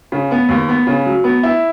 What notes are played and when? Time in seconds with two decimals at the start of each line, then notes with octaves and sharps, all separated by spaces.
0.12 C#3
0.31 B3
0.49 D#2
0.68 B3
0.87 C#3
1.06 F#3
1.24 B3
1.43 E4